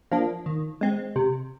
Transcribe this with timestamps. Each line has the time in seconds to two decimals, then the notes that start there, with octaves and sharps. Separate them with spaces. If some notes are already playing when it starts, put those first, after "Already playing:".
0.11 F3 A#3 D4
0.46 D#3
0.81 G#3 C4
1.16 C3